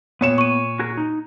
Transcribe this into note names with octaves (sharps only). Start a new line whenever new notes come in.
A#2 B3 C#5 E7
C#6 D#7
F#4 G#4 A#4
D#4